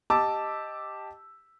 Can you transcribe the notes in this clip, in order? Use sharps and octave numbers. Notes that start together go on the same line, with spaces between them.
G4 D#5 A5 D6 E6